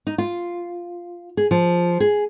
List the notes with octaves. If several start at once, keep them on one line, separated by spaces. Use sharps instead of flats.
D#4
F4
G#4
F3
G#4